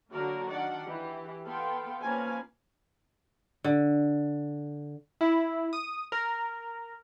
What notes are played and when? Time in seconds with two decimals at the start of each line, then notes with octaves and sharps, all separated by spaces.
0.12 D3 F#3 A#3 F#4 A#4 D5
0.49 D#3 D4 D5 F#5
0.85 E3 G4
1.46 B3 A4 F5 G5 C6
2.03 F3 A#3 C#4 B4 F5 G#5
3.64 D3
5.21 E4
5.73 D#6
6.12 A#4